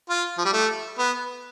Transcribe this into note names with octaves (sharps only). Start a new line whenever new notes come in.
F4
F3
G3
A3
B3